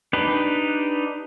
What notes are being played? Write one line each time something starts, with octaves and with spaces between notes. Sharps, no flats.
D4 D#4 G4 B4